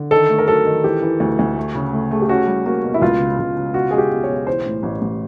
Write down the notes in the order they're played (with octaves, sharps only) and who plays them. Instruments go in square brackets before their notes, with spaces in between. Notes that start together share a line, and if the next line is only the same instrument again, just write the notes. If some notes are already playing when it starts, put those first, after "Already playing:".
Already playing: [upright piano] D3
[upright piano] D#3 [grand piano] A4
[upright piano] A3
[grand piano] A#4
[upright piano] F#3 [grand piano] A4
[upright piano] D#3
[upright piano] E3 [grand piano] G4
[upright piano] E3
D2
D2
A3
C#3
A3
[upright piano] A3 [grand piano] G#4
[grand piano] G4
[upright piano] C#4 [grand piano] F#4
[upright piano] G3
[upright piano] A#3 [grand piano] F#4
[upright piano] B2
[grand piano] E4
[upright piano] C#2 [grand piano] F4
[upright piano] C#3
C#2
C#3
[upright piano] B2 [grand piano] F#4
[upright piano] G#3 [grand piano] G#4
[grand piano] G4
[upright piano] B1
[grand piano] C#5
[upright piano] B1
[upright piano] E3 [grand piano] C5
[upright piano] A2
A1
A1